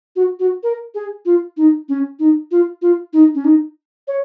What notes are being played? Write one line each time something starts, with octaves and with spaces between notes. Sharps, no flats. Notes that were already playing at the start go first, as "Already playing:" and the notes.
F#4
F#4
A#4
G#4
F4
D#4
C#4
D#4
F4
F4
D#4
C#4
D#4
C#5